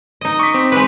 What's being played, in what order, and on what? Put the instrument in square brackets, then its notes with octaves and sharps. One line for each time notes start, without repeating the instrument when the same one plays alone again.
[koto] D#4 D#5
[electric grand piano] C#6 D6 B6
C4
[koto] G#3 B4